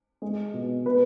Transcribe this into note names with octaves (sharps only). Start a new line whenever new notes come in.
G#3
B2
B2 B4